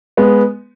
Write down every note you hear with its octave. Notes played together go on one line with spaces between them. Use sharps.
G#3 B3